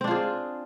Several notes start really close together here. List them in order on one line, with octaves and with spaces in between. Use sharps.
C4 D4 F4 G#4